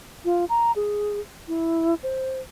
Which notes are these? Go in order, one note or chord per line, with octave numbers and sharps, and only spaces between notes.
F4
A#5
G#4
E4
C5